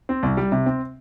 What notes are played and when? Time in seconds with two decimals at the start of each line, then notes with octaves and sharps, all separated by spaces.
0.09 C4
0.23 C2
0.37 G3
0.52 C3
0.66 C4